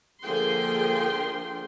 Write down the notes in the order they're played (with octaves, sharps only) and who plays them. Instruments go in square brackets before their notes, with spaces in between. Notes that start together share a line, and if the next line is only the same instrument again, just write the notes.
[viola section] D3 F3 A#3 G#4 G5 C6